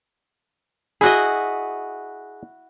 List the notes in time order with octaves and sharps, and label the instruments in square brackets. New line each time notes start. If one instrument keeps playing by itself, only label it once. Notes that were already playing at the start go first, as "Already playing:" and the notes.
[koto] E4 F#4 D#5 [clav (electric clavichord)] G#4